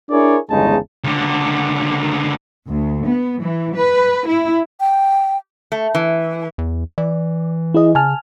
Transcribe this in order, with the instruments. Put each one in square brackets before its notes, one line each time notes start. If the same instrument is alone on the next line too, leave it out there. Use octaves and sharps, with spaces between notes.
[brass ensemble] D4 E4 G#4 A#4 C#5 D5
G1 E2 C#3 G#3 D#4 A5
[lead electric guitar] C#2 D3
[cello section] D2
B3
E3
B4
E4
[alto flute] G5
[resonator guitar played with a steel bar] A3
E3
[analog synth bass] E2
[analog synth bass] E3 [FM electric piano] D5
[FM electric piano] E4 G#4 D#5
[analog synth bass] C#3 [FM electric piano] G#5 A5 F6